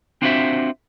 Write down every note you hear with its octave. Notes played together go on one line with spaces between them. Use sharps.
C4 D4 F4 F#4 C5 E5